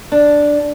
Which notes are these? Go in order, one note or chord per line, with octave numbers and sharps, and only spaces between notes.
D4